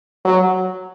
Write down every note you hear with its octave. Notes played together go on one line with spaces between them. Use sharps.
F#3